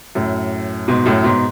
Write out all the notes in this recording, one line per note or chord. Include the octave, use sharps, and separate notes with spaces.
F#2 A2
G#2 B2
F#2 A2
G#2 B2